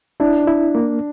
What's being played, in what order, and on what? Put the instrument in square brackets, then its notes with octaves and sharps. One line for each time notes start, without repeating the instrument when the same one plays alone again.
[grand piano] D4 [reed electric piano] E4
[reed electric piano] E4
A#3